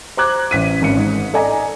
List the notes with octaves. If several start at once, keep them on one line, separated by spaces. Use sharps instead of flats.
C5 A#5 D6 F#6 G#6
A1 B6 D#7
G#1 C#4 C#7
G#2
A4 D5 D#5 G#5 A#5